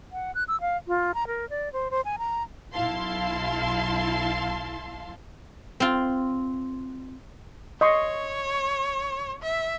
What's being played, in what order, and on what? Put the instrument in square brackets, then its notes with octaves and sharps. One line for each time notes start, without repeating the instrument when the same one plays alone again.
[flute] F#5
F#6
E6
F5
F4
A#5
A#4
D5
C5
C5
G#5
A#5
[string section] B1 E4 F5 A5 C6
[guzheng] C4 F4
[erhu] C#5 [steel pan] D#5 C6 C#6
[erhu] E5